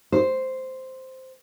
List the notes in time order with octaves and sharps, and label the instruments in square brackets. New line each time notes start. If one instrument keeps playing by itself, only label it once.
[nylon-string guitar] C5